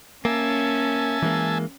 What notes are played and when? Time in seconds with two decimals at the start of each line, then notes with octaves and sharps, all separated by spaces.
0.25 A#3 C#4 E5 G#5 A5
1.23 E3 G#3 A#3